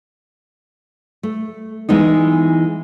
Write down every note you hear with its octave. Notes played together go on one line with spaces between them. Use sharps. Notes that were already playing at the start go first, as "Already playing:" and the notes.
A3
E3 G#3 B3 D#4